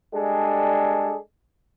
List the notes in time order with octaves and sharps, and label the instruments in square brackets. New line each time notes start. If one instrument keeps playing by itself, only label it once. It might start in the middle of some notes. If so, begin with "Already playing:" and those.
[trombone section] G3 G#3 D4 G#4 A4